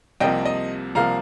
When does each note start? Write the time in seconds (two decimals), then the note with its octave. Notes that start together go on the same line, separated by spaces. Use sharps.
0.20 C2 C3 F3 A#3 D#5 G5
0.45 D#5
0.95 C2 C3 F3 A#3 F5 A#5